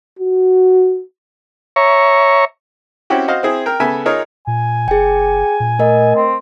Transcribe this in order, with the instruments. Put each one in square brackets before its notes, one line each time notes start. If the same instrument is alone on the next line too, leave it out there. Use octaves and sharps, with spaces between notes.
[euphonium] F#4
[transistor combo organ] C#5 E5 A#5 C#6
[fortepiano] C4 C#4 E4 F#4 G4
F#4 C5 D#5 F5
C4 E4 G#4
A#4 G5
C#3 B3 A4 E5 G#5
D#4 F4 G#4 A#4 C#5
[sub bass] A#2 [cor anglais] G#5
[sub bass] F#1 [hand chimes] G#4 G5
[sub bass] A#2
[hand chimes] A3 A#4 D#5
[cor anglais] C4